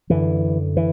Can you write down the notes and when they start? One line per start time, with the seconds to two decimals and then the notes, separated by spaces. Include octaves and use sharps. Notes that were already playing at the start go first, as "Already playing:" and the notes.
0.10 F#2 D3 E3
0.77 E3